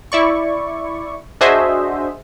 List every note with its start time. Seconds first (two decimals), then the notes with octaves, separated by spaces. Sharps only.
0.12 E4 D5 C#6
1.41 D4 F#4 G#4 C5 D#5 E5